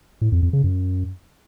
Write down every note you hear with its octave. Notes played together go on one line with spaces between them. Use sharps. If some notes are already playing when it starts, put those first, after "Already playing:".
A2
F2
F2
C#3
F#2